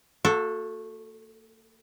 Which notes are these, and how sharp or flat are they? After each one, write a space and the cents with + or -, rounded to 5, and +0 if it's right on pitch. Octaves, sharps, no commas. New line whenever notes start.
A#3 -45 F#4 -20 A4 +0